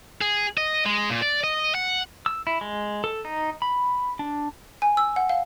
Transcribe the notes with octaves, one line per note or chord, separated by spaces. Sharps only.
G#4
D#5
G#3
A#2
D5
D#5
F#5
E6
E4
G#3
A4
D#4
B5
D4
G#5
E6
F#5
F5